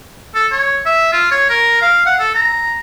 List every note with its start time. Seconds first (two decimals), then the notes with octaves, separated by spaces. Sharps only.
0.35 A4
0.52 C#5
0.86 E5
1.12 F4
1.31 C#5
1.49 A#4
1.82 F5
2.06 F#5
2.19 A4
2.35 A#5